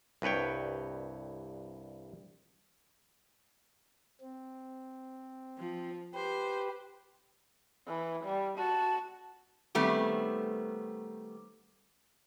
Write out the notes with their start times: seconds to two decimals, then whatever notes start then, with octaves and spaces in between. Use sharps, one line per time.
0.22 C2 G2 B4 C#5 G5
4.21 C4
5.58 F3
6.14 G4 B4 C5
7.88 E3
8.24 G3
8.58 F#4 A5
9.75 D#3 G3 A3 B3 C4